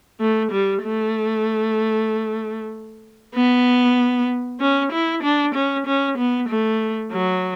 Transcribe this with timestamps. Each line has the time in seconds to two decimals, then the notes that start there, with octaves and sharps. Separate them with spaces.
0.20 A3
0.51 G3
0.83 A3
3.35 B3
4.60 C#4
4.92 E4
5.23 D4
5.54 C#4
5.86 C#4
6.18 B3
6.49 A3
7.12 F#3